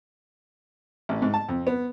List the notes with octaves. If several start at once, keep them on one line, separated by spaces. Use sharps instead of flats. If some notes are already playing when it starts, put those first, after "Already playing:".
A1
G#2
A5
F2
B3